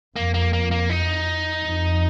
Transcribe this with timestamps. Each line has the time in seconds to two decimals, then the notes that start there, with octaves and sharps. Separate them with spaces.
0.16 F2 A#3
0.34 A#3
0.53 A#3
0.71 A#3
0.90 D#4
1.63 F2